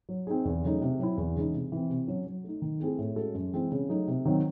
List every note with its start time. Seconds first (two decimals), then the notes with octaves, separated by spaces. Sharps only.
0.09 F#3
0.27 C4 D#4 G#4
0.45 E2
0.63 C#3 F#3 A3 D#4
0.82 C3
0.99 F#3 C4 E4
1.18 E2
1.35 C#3 E3 G#3 D#4
1.53 C3
1.72 E3 C4
1.90 C3
2.08 F#3 C#4
2.26 F#3
2.44 A3 D#4
2.62 D#3
2.80 A3 C4 E4 G#4
2.98 A2
3.16 G#3 C#4 F#4 A4
3.35 F#2
3.53 E3 G#3 C4 E4
3.72 C#3
3.89 F#3 A3 D#4
4.08 C3
4.25 D#3 F#3 C4